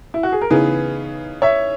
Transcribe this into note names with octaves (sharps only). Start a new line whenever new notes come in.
E4
F#4
G#4
A#4
C#3 E3 B3 D#4 G#4 B4
C#5 E5